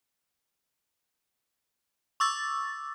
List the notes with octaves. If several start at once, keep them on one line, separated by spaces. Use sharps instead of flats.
C#6 D6 E6 A6